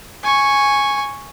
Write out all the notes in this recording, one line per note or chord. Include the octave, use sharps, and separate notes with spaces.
G#5 C#6